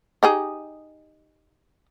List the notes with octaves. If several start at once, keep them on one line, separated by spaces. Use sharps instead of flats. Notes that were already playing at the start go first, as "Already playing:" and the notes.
D#4 G4 G#4